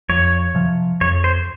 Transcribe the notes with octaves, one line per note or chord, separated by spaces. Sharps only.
F2 C#5
C3 F3
F2 C#5
C5